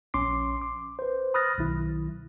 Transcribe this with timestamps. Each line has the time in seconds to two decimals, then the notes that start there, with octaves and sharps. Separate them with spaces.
0.14 A#1 C#4 C6 D6 C7
0.62 D6
0.99 B4 C5
1.34 B5 D#6 F6 F#6 A6 A#6
1.58 B1 D#3 E4